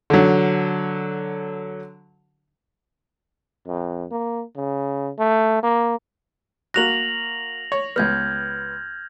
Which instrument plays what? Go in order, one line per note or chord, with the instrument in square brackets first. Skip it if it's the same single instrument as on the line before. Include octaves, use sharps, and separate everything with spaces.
[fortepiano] D3 F#3
[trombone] F2
A#3
C#3
A3
A#3
[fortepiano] A#3 F#4 F#6 [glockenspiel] A#6 F7 F#7
[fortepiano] C#5
[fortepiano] C#2 B3 [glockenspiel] F6 G6 G#6